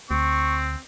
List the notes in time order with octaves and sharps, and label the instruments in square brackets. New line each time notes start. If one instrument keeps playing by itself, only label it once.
[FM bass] D2 [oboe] C4 [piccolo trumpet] C#6